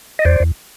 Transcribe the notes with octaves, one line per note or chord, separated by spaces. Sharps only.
D#5
E2 C5 D5
E2